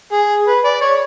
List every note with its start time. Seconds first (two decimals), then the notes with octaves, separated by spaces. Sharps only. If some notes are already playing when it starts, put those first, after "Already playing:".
0.13 G#4
0.47 B4
0.65 D5
0.81 C#5